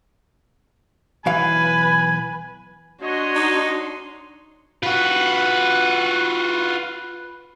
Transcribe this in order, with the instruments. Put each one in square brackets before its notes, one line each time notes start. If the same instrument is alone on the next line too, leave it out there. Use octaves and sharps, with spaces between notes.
[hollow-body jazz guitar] B1 E3 F5 [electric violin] B4 [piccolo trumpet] G#5
[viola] D4 C6 [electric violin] F#4 [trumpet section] C#5 D#5
[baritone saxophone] D#4
[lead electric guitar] F4 F#4 [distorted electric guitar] B4